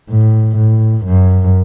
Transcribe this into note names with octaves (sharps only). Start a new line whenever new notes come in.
A2
A2
F#2